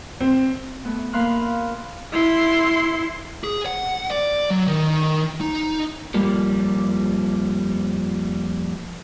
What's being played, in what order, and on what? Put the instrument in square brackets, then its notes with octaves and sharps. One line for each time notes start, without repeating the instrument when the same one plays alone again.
[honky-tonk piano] C4
[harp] A3 B3
A#3 F5 B5 C6 F6 F#6
[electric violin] E4 C6
[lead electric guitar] G#4
F#5
D5
F#3
D#3
D#4
[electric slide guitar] F2 F3 G3 A#3